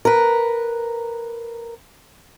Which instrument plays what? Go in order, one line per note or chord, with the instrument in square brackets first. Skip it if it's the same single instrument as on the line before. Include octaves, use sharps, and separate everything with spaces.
[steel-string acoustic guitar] A#4 B4